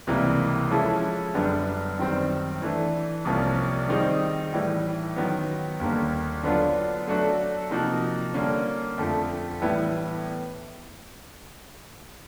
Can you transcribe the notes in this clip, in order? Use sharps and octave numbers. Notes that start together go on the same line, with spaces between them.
C#2 C3 E3 G3 A#3
F3 G#3 C#4 E4 A4
F#2 D3 G3 B3 D4
F#2 D#3 G3 C4
E3 A3 D4
C2 C3 F3 A#3 C#4
D#3 G3 C4 D#4 G#4
A2 E3 G3
D#3 F#3 B3
D#2 D3 G3 A#3
D3 F#3 B3 D4 F4
F#3 A3 D4 F#4 A4
C3 F3 A#3 D#4 F#4
D3 G3 A#3 C#4
F2 D3 F3 A3
A2 E3 G3 B3 E4